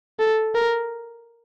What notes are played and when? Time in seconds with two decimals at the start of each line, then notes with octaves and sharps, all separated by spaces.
0.19 A4
0.55 A#4